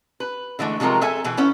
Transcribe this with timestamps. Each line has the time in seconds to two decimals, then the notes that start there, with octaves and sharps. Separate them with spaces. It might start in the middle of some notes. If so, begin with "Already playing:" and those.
0.20 B4
0.59 D3 E3 G#3 A3
0.80 C3 F3 F#3 G#3 A#4
1.01 G#4 A4 E5 G#5
1.24 B2 E3 G#4
1.37 B3 C#4 E4